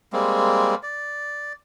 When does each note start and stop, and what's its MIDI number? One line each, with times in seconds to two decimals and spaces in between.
0.13 0.75 55
0.13 0.75 56
0.13 0.75 58
0.13 0.75 60
0.83 1.53 74